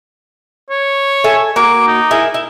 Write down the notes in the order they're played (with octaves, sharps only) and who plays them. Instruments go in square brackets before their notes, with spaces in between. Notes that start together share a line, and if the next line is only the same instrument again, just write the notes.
[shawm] C#5
[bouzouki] A4 E5 G#5
[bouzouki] A#3 F#4 [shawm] D6
[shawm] D#4
[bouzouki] E4 G#4 A#4
E4